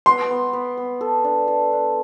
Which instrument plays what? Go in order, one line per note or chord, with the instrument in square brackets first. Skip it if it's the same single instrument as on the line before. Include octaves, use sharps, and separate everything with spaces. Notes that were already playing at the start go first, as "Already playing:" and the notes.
[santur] B3 [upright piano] C6
[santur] B3
B3
B3
A4
D4
A4
D4